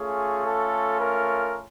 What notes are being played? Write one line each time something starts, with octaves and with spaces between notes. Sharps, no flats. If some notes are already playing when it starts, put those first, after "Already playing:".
Already playing: A3 C#4 F4 G#4
A4
A#4